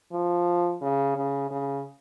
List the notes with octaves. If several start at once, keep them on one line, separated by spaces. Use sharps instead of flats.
F3
C#3
C#3
C#3